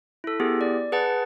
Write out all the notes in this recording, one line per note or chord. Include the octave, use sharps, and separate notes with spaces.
E4 A4
B3 E4 G4 G#4
D5
G#4 B4 F#5 A5 A6